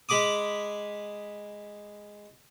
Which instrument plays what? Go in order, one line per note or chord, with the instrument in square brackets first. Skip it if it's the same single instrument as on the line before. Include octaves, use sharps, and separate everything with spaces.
[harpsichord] G#3 B5 D6 D#6